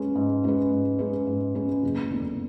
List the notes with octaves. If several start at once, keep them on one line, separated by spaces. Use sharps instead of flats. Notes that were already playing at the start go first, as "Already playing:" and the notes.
Already playing: G#3 C#4 G#4 B4
G#2
G#3 C#4 G#4 B4
G#2
G#3 C#4 G#4 B4
G#2
G#3 C#4 G#4 B4
F#1
E2 D3